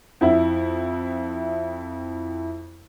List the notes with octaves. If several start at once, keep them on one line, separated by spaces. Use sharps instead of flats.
F2 E4 E5